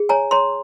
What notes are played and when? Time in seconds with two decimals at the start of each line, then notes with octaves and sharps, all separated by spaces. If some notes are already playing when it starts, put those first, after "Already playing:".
Already playing: G#4
0.09 C#5 G#5 A#5
0.31 C#5 A#5 C6